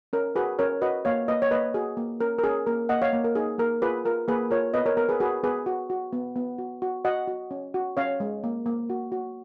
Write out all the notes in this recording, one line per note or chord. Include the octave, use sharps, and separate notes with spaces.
C#4 A#4
F#4 G#4 B4
C#4 A#4 C#5
F#4 B4 D#5
A#3 C#5 F5
A#3 B4 D#5
C#5
A#3 B4 D#5
F#4 G#4
A#3
C#4 A#4
A#4
C#4 G#4
A#3 A#4
A#3 D#5 F#5
C#5 F5
A#3
A#4
D#4 G#4
A#3 A#4
F4 G#4 B4
F4 A#4
A#3 G#4 B4
F4 A#4 C#5
B3 B4 D#5
A#4 C#5
B3 A#4
G#4 B4
F#4 G#4 B4
B3 G#4 B4
F#4
F#4
B3
B3
F#4
F#4
F#4 D#5 F#5
F#4
C#4
F#4
C#4 C#5 F5
G#3
A#3
A#3
F#4
F#4